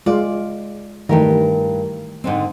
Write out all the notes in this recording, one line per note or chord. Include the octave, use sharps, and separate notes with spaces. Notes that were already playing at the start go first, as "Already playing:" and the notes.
G#3 F4 D5
G2 D#3 E3 A3 G4 A#4
G#2 D3 C4